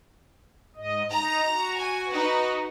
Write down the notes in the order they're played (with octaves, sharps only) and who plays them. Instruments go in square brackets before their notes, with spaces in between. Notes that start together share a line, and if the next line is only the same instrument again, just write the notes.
[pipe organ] G#2 D#5
[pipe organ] D#4 [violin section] A#5
[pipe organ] F#4
[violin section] G#5
D#4 B4